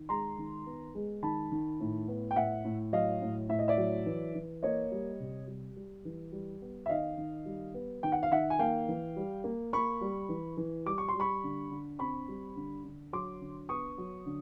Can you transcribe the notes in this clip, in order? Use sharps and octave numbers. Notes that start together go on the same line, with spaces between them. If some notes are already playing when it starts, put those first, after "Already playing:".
Already playing: D#3
G#3 A#5 C6
D#3
B3
G#3
D#3 A5 B5
D#3
A2
B3
G5
A2 E5 F#5
A2
F#3 D#5 F5
A2
A2 E5
D#5
D5 E5
F#3
E3
E3
A#3 C#5 D#5
G3
C3
G3
G3
E3
G3
B3
E5
D#3 D#5 F5
D#3
G3
B3
D#3 G5
F#5
F5
D#3 E5 F#5
G#5
A#3 F5 G5
E3
G3
A#3
A#3 B5 C#6
G3
E3
E3
G3 D6
C#6
C6
G3
B5 C#6
D3
D3
C4 B5 C#6
G3
D3
D3
F#3 C6 D6
D3
B3 C#6 D#6
F#3
D3